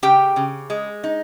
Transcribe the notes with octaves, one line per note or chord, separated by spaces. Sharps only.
C#3 G4 G5
C#3
G#3
D#4